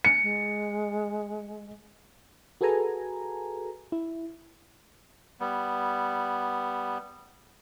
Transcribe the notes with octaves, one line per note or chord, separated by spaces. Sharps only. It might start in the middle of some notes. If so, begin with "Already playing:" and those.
C#7
G#3
F#4 G#4 A4 B4 G#5 A#5
E4
G3 B3